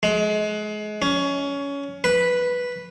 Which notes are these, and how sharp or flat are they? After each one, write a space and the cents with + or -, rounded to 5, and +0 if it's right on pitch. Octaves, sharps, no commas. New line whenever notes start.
G#3 +30
C#4 +20
B4 -5